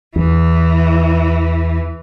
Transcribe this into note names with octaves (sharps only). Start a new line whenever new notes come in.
E2 E3